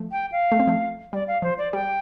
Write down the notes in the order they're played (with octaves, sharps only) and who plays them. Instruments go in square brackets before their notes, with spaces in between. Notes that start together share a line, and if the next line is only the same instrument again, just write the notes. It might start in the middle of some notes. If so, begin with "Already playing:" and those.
Already playing: [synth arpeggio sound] F3 A3
[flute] G5
F5
[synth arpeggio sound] A3
C4
F3 A3
[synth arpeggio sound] G3 [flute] D5
[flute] F5
[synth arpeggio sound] F3 [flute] C5
[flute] D5
[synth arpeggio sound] G3 [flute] G5